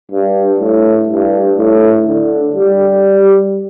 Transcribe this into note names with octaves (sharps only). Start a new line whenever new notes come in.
G2
A2
G2
A2
D3
G3